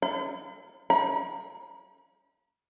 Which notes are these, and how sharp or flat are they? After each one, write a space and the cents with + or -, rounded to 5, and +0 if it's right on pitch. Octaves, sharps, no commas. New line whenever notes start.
B5 +45
B5 -40